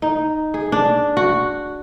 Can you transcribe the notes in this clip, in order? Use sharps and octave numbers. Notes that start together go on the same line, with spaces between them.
D#4
G#4
D4
F#4